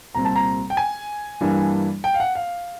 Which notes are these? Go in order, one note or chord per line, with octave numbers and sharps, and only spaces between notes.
C2 A#2 G3 C4 A#5
A5
A#5
G5
G#5
G2 E3 G3 A#3 D4
G5
F5
F#5
F5